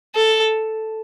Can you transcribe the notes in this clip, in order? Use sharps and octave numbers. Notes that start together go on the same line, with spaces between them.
A4